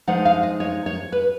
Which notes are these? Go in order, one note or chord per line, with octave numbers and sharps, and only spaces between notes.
F3 G#3 D#4 F#5
F5
D#5
C#5
C#5
B4